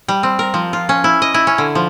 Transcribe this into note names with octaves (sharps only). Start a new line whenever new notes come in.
G3
C4
A#4
F3
F4
C#4
E4
D#5
E4
C#4
D3
F3